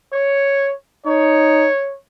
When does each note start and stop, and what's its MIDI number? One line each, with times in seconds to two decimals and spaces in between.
0.13 0.72 73
1.06 1.69 63
1.06 1.96 73